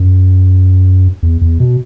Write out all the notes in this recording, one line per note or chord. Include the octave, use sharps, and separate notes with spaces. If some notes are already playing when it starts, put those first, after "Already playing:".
Already playing: F#2
E2
E2
B2